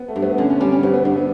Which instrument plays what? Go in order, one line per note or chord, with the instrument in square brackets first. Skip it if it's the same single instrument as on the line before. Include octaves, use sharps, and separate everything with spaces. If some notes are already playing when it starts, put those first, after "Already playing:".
Already playing: [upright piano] B3
A3
[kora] G2
[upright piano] B3
[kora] D3 [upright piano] C#4
[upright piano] C#4
[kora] G3 [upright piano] C#4
[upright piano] C#4
[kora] G2 [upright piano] B3
[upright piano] B3
[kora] G2 [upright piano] B3
[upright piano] B3